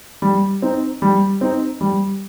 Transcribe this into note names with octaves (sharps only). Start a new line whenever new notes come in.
G3
C4 D#4
G3
C4 D#4
G3